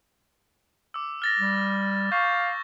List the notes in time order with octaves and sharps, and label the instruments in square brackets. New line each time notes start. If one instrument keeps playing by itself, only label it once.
[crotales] D6 E6
F6 A6 A#6
[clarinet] G3
[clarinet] F5 [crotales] C#6 G6